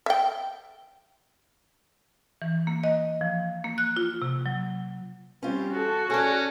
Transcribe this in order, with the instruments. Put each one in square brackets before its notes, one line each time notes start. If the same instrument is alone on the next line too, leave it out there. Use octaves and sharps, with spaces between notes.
[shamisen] E5 G5
[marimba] E3
A#3
D#5
F3
A#3
F#6
F4
C3
F#3
[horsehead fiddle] G3 C4 [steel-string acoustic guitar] C#4 F4
[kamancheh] F#4 [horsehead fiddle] A4
[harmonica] C#4 [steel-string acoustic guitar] G#4 D5 [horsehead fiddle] A4